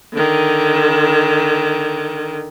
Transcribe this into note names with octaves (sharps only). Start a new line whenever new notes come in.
D3 D#3